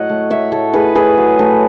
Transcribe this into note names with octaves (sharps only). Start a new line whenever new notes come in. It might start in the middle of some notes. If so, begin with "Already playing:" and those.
Already playing: A2 F#3 C#5 D#5 F#5
A3
F#3 C#5 E5
A2 A4 C#5
A2 G#4 B4
A3 G#4 B4
F#3
A2